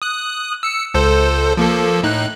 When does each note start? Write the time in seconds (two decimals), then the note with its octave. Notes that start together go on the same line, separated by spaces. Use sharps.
0.02 D#6 F#6
0.63 E6 C#7
0.94 C#2 A4 C5
1.57 F3 A#3 A4
2.03 A2 D#4 F#6